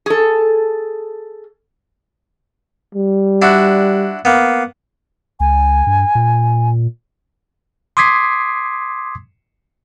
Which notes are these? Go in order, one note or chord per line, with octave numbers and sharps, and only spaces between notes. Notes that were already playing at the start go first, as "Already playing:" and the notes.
G#4 A4
G3
D4 E4 F#4
A#3 B3
C#2 G#5
G2
A#2
C6 D6 D#6 G#6 B6 C7